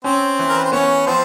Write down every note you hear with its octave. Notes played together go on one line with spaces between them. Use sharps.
C4 C#4 C5
E3
A#4
B4
C5
B3 C#4 C#5
F3 C4 C5